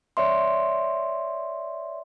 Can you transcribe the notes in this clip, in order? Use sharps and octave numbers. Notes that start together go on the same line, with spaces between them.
C#5 D5 E5 C6